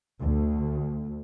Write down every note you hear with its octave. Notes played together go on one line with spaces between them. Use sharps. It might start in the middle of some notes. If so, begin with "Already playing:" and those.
D2